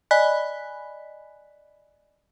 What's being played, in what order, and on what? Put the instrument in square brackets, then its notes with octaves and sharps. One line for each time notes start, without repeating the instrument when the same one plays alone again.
[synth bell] D5 D#5 G#5 B5 F#6 B6